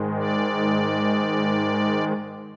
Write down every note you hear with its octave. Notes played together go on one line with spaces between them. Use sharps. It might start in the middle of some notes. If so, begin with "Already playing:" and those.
Already playing: G#2 D#3 G#3
D5